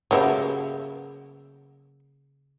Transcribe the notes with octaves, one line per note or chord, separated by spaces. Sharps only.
C#3 F#3 A#3 B3 G4 E5